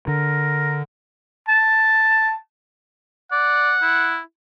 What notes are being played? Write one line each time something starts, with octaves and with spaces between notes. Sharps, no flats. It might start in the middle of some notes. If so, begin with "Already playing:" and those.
D3 A#4
A5
D5 F#5
E4